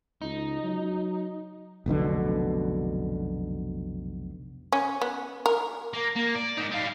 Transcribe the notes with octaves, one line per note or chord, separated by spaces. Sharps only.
C#2 D#4
F#3
F1 B1 B2 D3
C#4
B3
A#4
A#3
A#3
D5
G#2 D#4
G3 F5